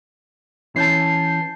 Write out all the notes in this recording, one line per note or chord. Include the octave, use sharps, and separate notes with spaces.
E3 C#4 A5 G6 C7